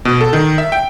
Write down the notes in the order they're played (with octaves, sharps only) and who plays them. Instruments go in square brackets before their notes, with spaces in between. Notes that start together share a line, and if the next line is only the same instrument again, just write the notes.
[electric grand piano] B2
A4
D#3
E5
G5